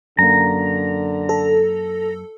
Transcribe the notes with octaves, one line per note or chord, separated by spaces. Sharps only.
F#2 D3 A#3 A#5
A4